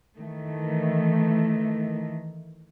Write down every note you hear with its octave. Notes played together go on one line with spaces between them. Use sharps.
D#3 E3 A3